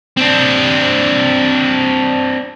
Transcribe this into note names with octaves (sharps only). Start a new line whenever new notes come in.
C4 D4